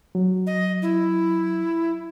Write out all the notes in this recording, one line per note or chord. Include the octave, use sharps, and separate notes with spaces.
F#3
D#5
E4